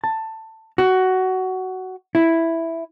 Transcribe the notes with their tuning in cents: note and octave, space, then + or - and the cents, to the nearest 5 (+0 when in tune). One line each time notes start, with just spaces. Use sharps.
A5 +15
F#4 +15
E4 +0